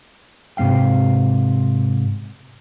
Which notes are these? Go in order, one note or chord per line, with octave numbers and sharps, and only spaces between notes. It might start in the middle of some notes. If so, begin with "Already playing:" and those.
G#2 C3 A#3 F5 G5